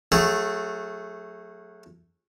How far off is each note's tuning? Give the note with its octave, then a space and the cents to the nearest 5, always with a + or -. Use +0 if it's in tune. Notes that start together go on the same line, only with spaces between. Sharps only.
F#3 -30 A3 +0 G#4 -20